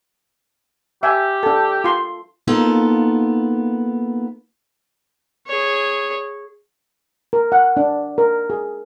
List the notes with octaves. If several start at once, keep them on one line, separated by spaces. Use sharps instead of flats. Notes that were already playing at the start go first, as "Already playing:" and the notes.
G4 E5 G#5
D4 A4
F4 C6
A#3 B3 D#4 F4 A4
G#4 C#5
A#4
F#5
D4
A#4
G#4